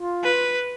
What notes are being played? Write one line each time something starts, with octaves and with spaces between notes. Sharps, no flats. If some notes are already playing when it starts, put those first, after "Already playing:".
Already playing: F4
B4